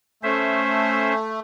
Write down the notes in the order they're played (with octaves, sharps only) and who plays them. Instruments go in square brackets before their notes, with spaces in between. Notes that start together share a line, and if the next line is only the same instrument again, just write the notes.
[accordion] A3 [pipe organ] C#4 C5 E5